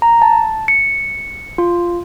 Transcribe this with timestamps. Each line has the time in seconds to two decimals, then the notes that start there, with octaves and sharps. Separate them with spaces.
0.02 A#5
0.22 A5
0.68 C#7
1.58 F4